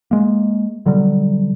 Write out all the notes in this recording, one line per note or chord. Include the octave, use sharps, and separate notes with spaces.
G#3 A#3
B2 D3 F#3 G3